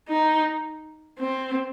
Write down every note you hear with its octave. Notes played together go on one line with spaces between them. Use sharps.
D#4
C4